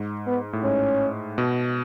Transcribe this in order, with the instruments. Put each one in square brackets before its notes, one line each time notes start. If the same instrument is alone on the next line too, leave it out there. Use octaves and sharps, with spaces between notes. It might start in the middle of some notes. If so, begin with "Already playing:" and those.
Already playing: [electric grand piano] G#2
[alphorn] B3
[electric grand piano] A2
[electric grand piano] G#2 [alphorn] C#4
[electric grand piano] B2